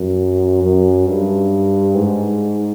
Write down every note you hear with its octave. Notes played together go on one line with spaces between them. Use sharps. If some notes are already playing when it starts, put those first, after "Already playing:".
Already playing: F#2
F#2
G2
G#2